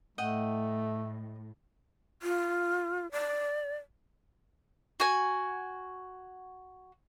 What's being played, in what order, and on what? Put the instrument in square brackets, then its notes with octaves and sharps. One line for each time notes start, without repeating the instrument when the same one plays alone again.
[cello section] A2 [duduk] A3 [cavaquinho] D#5 F#5 G5
[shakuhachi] F4
D5
[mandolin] F#4 G#5